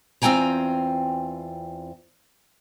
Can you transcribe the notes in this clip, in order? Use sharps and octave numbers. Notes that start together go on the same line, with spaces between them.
E2 C4 F4 G5 G#5 A#5